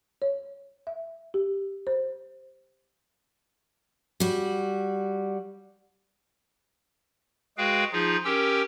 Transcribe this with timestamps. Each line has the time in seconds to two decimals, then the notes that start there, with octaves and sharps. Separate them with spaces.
0.22 C#5
0.87 E5
1.34 G4
1.87 C5
4.20 G3 F#4
7.58 G#3 F#4 G#4 B4 F5 G5
7.93 F3 D#4 F4 G#4
8.25 C#4 G4 A#4 G5 E6